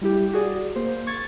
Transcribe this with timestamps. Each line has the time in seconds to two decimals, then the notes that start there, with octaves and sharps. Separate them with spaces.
0.01 G3 E4 G4
0.33 F#4 G#4 D5
0.76 A#3 C5
1.07 C#6 G#6 A6